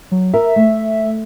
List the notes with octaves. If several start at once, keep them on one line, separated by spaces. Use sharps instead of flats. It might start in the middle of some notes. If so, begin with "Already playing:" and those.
F#3
A#4 E5
A3